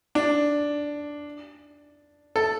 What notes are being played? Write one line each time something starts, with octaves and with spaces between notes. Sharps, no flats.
D4
A4